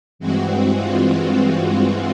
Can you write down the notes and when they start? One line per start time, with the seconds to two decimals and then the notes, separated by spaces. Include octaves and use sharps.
0.19 G2 E3 G#3 C4 F#4
0.75 F4